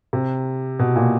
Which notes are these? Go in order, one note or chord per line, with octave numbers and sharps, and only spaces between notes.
C3
B2
A#2